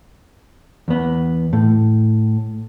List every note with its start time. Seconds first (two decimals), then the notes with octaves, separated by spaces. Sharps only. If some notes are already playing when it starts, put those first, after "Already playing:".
0.88 E2 B3
1.53 A2